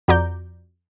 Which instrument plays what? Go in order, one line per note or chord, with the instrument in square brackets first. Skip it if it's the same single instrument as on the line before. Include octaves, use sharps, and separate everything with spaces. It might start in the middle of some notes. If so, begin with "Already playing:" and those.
[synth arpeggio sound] F2 F#4 D5 A#5 D6 G6